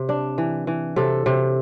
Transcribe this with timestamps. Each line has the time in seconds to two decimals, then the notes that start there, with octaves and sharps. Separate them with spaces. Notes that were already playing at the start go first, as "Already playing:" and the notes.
Already playing: C3
0.09 D4
0.38 E3
0.67 E3
0.96 C3 A4
1.26 C3